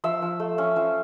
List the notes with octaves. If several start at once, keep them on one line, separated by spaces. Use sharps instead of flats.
F3 E5
F3
A3
C#4
F3